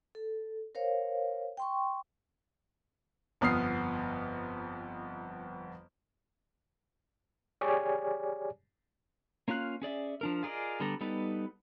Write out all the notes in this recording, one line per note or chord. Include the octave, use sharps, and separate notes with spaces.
A4
A#4 C5 C#5 F5
G5 C6 C#6
G1 F2 B3 D#6 F6 C7
G4 G#4 C#5 D5 G#5
A#3 C#4 F4 F5 F#6
C#4 G#4 D5 E5
F3 D4 A#4
F4 G#4 A#4 D5 D#5
D3 G3 B3 A4 A#5
G3 B3 D#4 A4 B4